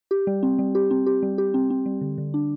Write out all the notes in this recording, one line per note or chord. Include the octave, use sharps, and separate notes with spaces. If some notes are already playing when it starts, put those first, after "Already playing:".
G4
G3
C4
G3
G4
C4
G4
G3
G4
C4
C4
G3
D3
D3
D4